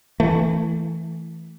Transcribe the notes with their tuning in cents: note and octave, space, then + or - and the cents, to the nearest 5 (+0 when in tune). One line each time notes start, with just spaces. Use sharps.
E3 +0 A3 +0